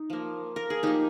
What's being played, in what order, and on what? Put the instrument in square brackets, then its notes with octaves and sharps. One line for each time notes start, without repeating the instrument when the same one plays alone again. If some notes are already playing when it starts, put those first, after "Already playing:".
Already playing: [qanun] D#4
F3 A#3
A#4
G#4
F3 A#3 D#4 G4